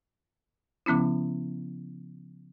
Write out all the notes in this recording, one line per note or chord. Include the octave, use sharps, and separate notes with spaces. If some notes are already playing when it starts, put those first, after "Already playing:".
C#3 F3 B3 C#4 E4